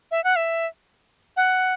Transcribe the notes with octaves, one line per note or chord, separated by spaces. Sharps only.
E5
F#5
E5
F#5